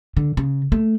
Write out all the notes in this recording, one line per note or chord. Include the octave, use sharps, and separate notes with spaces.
D3
C#3
A3